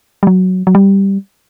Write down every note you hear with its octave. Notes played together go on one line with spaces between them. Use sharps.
G3
F#3
F#3
G3